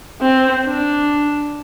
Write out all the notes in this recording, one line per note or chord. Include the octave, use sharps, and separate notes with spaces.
C4
D4